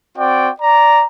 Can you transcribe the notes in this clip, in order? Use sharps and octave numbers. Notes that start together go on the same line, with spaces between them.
C4 F#4 D5 G5
D5 A#5